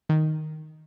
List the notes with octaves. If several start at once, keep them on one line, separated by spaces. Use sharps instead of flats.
D#3